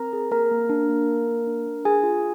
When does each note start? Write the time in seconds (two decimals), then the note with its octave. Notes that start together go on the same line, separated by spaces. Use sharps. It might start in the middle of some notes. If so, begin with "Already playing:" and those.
Already playing: C4 A#4 A#5
0.13 G#4
0.31 A#3 A#4 A#5
0.51 A#3
0.69 D4
0.89 A#3
1.08 A#3
1.27 A#3
1.47 D4
1.66 D4
1.85 G#4 G#5
2.03 F4